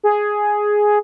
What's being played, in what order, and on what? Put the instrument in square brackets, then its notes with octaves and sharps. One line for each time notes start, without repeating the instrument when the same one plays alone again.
[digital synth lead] G#4